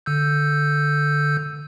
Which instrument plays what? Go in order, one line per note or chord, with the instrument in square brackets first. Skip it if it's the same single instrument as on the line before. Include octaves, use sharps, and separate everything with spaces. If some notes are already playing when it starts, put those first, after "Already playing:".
[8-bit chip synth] D3 E6 G6